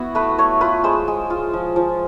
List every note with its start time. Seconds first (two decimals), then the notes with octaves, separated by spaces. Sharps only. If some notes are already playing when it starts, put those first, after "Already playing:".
Already playing: B3 E4 F#4
0.15 A3 B4
0.38 A3 C#5
0.61 F4 B4
0.84 G#3 C5
1.08 G#3
1.30 F4
1.53 F3
1.76 F3